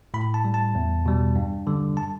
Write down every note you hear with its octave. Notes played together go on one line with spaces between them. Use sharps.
A2 B5
A5
G3
A5
E2
B2 G3
G2
D3 G3
A5